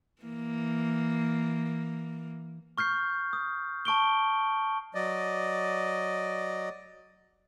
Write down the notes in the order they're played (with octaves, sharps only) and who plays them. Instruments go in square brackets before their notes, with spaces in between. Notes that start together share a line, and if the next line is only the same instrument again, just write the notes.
[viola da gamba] E3 A#3
[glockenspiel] C#6 F6 G6 C7
D#6
A5 C#6 D7 G7
[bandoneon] F#3 D5 D#5